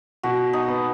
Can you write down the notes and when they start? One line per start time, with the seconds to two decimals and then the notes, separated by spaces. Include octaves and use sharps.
0.23 B2 F#4
0.53 D#4
0.68 B3